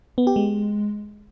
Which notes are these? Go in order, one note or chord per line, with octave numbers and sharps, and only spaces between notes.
B3
G4
G#3